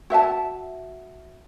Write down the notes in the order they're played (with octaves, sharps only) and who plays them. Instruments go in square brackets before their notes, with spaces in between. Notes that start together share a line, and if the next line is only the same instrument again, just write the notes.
[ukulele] F#4 E5 F5 A5